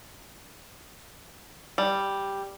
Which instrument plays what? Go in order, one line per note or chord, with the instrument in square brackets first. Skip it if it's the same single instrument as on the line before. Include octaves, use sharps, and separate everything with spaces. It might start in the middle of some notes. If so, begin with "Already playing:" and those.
[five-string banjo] G3